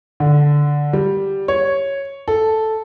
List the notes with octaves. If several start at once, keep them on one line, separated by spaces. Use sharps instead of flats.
D3
G3
C#5
A4